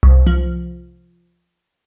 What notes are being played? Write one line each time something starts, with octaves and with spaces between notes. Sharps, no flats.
C2
F3